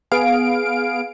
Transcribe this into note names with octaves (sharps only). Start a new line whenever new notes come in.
B3 G#4 F5 D7